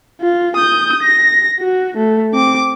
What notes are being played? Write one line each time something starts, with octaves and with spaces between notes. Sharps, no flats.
F4
D#6 G6
A#6
F#4
A3
C4 D6